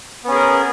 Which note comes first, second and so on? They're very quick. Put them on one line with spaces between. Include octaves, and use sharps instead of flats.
B3 C#4 G#4 A#4